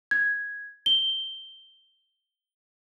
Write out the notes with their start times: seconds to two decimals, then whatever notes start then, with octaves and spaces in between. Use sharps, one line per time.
0.11 G#6
0.86 G7